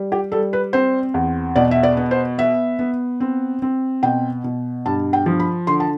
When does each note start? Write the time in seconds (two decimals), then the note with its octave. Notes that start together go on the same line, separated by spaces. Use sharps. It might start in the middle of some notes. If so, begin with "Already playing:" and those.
Already playing: G3
0.12 G4
0.32 G3 A4
0.53 B4
0.73 C4 C5
1.14 E2
1.56 B2 D5
1.71 E5
1.83 D5
1.97 B3
2.11 C5
2.38 B3 E5
2.79 B3
3.20 C4
3.62 C4
4.03 B2 G5
4.44 B2
4.86 G2 A5
5.13 G5
5.26 F3
5.40 B5
5.67 D3 C6
5.80 A5